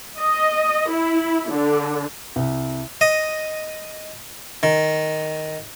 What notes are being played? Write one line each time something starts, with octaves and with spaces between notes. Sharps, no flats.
D#5
E4
D3
C2
D#5
D#3